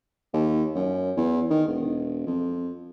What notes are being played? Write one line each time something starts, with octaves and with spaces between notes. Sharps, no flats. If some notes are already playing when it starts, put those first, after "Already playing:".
D#2
F#2
E2
D#3
E1
F2